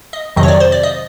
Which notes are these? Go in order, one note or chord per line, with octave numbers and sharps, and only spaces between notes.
D#5
F2 C3 D#3 F#3 D#5
C#5
D5
C5
D5
D#5